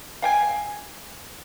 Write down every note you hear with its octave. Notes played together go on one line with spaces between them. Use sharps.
F5 G5 G#5